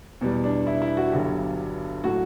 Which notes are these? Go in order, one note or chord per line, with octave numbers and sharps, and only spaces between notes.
E2 B2 G3
D4
E4
E4
F#4
G1 G2 F#3 G4
A2 F#3 A3 F#4